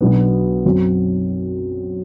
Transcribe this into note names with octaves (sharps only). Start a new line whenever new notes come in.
B1 B2 F#3 B3 D4
F#2 F#3 C4